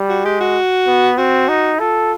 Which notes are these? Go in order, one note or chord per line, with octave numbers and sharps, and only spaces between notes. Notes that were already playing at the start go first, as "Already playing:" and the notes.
Already playing: G3
F#4
G#3 G4
F#4
B3
C4 F#4
D#4
F4 A4